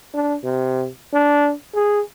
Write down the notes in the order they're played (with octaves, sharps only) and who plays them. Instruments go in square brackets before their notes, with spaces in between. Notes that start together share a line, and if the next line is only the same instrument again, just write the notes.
[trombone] D4
C3
D4
G#4